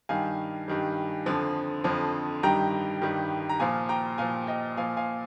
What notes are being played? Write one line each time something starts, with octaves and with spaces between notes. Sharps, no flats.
G2 D#3 G3 F5 G#5
G2 D#3 G3
F2 D3 F3
F2 D3 F3
G2 D#3 G3 G5 A#5
G2 D#3 G3
A#5
A#2 F3 F5 G#5
G5 A#5
A#2 F3 F5 G#5
D#5 G5
A#2 F3 F5 G#5
F5 G#5